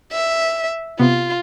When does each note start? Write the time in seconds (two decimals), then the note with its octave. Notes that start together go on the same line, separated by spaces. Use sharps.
0.12 E5
0.99 C3 B3 F4